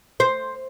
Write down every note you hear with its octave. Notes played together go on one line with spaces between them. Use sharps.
C5